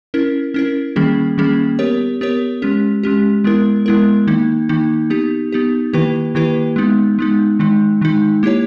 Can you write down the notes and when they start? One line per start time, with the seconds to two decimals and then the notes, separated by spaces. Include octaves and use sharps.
0.14 C#4 E4 A#4
0.54 C#4 E4 A#4
0.96 D#3 G3 A#3 C#4 G#4
1.38 D#3 G3 A#3 C#4 G#4
1.79 B3 G4 A#4 C#5
2.21 B3 G4 A#4 C#5
2.62 G#3 C#4 G4
3.03 G#3 C#4 G4
3.44 G#3 B3 E4 A#4
3.86 G#3 B3 E4 A#4
4.27 D#3 A#3 D#4
4.69 D#3 A#3 D#4
5.10 B3 D#4 G4
5.52 B3 D#4 G4
5.93 D#3 A#3 E4 G4 B4
6.35 D#3 A#3 E4 G4 B4
6.76 G#3 B3 D#4
7.19 G#3 B3 D#4
7.59 D#3 G#3 D#4
8.01 D#3 G#3 D#4
8.43 A#3 E4 G4 C#5